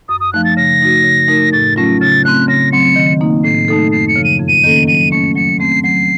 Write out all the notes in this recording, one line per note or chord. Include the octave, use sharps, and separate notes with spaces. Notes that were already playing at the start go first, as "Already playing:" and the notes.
F#2 D#6
D#6
F3 A3 D#4 F#6
A6
C#3 A#6
A3 D#4 F#4
C#3
A3 D#4 A#4
A2 A6
F#3 A3 C#4 F4 A#6
C#3 A6
A3 C4 F#6
C#3 A#6
F#3 C4 C#7
D#3
A#3 D#4
A2 C7
A3 D#4 A4
F#2 C7
C#7
C#3 F3
D#7
F2
D#7
D#3 A#3 C#4 A4
F#3 D#7
A3 C#4 C#7
F#3 C#7
A3 C4 C7
F#3 C7